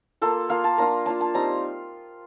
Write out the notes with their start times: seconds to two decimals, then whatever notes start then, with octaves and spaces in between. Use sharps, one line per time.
0.22 A#3 F4 A4
0.49 A#3 F4 F5
0.64 A5
0.78 A#3 D4 F4 A#5
1.06 A#3 D4 F4 A5
1.21 A5
1.34 G3 C4 D#4 A#5